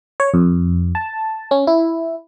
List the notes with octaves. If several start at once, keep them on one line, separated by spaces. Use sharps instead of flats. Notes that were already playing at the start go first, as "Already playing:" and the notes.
C#5
F2
A5
C#4
E4